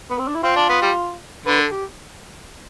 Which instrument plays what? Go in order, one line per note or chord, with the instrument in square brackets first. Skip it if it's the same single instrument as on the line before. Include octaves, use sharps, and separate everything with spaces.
[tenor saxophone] B3
C4
D4
E4
[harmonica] C4 [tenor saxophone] F4
[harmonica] D4
B3
G3
[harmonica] D3 [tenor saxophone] B4
[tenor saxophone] A4
G4